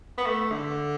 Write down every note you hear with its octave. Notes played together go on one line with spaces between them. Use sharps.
B3
A3
D3